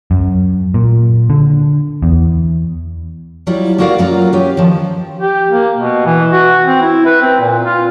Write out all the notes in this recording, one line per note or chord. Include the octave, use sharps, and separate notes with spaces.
F#2
A#2
D3
E2
F#3 G3 E4 F4
A#3 B3 F#4 A#4 D5 F5
F#2 F#3 A#3 F4 A#4 A#5
C#4 G4 B4
D#3 F3
G4
A#3
B2
E3
F#4
C4
E4
B4
C4
A#2
F4